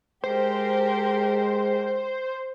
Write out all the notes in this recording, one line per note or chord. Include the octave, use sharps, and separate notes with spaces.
G#3 G4 A#4 C5